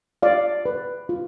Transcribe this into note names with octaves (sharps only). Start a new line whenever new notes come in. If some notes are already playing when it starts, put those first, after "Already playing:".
F4 D5 F5
B4
F4